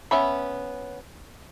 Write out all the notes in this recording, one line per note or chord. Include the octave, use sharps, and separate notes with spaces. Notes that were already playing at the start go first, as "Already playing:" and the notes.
B3 C#4 E5 B5